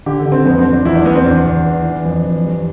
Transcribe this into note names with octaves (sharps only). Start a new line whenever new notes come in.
D3 G4
A4
D3
C4
F2 B3
C4
F2
D4
E2 E4
D4
E2 B3
C4
E2 D4
E2
E3
E3
F2
E3
G2